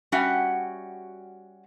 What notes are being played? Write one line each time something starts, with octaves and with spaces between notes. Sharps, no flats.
G3 C#4 F#4 E5 F#5 G5